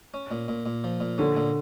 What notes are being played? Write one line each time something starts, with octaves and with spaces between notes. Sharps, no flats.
C#4
A#2
A#2
A#2
F3
A#2
D3 C#4
A#2